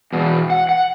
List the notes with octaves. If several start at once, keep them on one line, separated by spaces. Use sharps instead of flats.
E2 B2
F#5
F#5